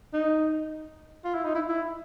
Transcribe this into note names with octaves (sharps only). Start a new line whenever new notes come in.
D#4
F4
E4
D#4
E4
E4